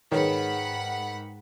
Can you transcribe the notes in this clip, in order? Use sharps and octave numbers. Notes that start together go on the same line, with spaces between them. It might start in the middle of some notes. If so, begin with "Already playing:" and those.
G#2 D#3 G#4 B4 C#5 F#5 B5